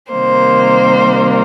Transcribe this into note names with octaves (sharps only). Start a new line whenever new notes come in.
C3 D#3 G3 A#3 C5